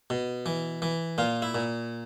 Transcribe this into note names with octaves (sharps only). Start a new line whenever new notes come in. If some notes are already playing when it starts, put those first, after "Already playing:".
B2
E3
E3
A#2 F4
E4
A#2